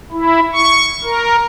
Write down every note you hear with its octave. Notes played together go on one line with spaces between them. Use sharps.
E4
C#6
A#4